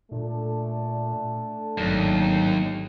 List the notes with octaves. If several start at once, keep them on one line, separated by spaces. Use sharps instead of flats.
A#2 A3 D4 A4
G#1 D#2 F#3